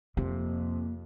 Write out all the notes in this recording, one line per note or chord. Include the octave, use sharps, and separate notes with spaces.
F2 C3 A#3